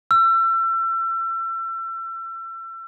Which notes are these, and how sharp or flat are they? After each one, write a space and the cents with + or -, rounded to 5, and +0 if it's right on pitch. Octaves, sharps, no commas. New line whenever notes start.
E6 +35